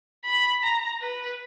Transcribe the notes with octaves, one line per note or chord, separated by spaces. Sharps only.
B5
A#5
B4